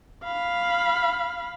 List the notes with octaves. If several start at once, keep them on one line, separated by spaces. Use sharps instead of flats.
F5 B5